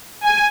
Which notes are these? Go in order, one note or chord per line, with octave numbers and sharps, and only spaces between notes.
G#5